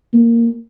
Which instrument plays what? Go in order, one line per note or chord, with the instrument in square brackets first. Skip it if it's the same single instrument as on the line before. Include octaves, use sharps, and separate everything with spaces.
[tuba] A#3